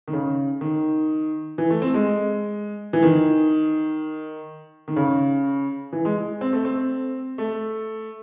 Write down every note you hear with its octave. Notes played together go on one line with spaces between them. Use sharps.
D#3
C#3
D#3
E3
A3
C4
G#3
E3
D#3
D#3
C#3
E3
G#3
C4
A3
C4
A3